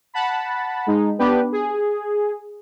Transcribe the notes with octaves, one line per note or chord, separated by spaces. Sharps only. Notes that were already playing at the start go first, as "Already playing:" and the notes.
F#5 A5 B5
G#3 D#4
B3 D4 G4 B4
G#4